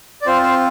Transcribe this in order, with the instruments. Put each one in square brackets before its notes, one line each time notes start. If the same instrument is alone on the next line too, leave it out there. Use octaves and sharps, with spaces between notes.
[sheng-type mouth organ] D5
C4 F4 C5
C5